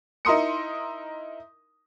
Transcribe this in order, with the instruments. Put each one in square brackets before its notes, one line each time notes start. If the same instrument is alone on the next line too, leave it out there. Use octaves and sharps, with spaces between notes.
[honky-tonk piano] D#4 E4 A#4 C6 D#6 C#7